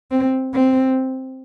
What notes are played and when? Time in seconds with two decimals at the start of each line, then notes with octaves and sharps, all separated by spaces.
0.11 C4
0.53 C4